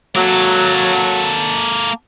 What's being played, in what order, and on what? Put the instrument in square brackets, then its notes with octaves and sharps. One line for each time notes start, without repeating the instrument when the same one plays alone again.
[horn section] F#3 [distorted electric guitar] A#3 A4